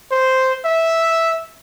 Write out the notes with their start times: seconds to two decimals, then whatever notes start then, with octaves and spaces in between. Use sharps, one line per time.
0.12 C5
0.65 E5